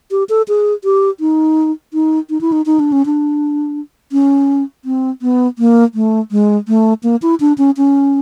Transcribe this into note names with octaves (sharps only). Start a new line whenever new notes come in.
G4
A4
G#4
G4
D#4
D#4
D#4
E4
D#4
D#4
D4
C#4
D4
C#4
C4
B3
A#3
A3
G#3
A3
A#3
E4
D4
C#4
C#4